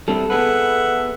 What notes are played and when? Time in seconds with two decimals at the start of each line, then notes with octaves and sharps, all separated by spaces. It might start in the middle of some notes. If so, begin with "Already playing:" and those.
0.08 G3 C4 E4 A4
0.30 B3 G#4 B4 E5 F#5